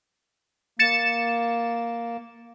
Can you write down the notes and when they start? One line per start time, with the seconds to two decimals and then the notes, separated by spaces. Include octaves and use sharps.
0.79 A#3 A6 C#7 E7